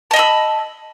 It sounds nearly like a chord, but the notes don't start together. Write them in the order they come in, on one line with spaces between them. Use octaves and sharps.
A5 D#5 B5 E6